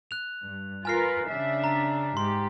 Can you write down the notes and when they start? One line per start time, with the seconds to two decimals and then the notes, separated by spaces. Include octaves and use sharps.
0.11 F#6 F7
0.43 G2
0.85 F4 A#4 B4 G#5 F6 C7
1.28 C#3 D4 E5
1.64 A#5
2.17 G#2 G4 C6